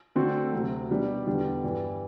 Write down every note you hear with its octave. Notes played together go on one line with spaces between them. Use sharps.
D3 A3 C4 F#4 A4
D2 C3 F#3
B2 G3 D4 G4
E2 D3 G3 D4 G4
G2 E3 G3